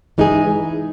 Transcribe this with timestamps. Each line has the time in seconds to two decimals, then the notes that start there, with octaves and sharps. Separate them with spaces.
0.18 E3 G#3 D#4 G#4